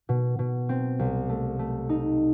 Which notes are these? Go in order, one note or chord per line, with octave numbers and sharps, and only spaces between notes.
B2
B2
C4
C2
A3
A3
D#4